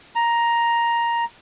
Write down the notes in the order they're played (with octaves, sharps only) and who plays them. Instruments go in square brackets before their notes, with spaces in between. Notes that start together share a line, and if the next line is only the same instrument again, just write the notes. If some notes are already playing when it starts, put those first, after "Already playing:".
[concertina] A#5